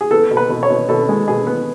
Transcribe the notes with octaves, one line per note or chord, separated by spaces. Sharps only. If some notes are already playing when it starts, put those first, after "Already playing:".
G#4
B3 A4
B2
B4
B2
C#5
B2
B2 A4
G#3
B2 G#4
B3